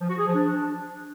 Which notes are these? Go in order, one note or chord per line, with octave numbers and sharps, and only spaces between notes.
F3
F#4
G#4
F3
D4